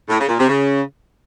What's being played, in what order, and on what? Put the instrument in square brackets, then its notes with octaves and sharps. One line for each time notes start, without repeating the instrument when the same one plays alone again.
[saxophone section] A2
C#3
A#2
C3
C#3